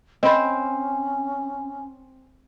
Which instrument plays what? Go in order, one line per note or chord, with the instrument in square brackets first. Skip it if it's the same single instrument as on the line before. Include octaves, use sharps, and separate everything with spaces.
[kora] C4 C5 [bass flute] C#4 [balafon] D#5 B5